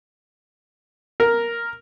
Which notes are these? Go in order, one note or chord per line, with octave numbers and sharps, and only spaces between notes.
A#4